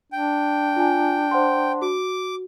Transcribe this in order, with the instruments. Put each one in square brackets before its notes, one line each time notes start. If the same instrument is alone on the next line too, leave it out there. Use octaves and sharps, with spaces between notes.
[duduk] D4 [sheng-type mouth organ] G5
[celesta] F4 G#5
C5 F#5 C6
[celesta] F#4 [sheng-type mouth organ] D6